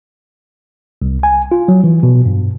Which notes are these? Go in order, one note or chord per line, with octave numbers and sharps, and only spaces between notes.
C2
G#5
F4
F#3
E3
B2
G2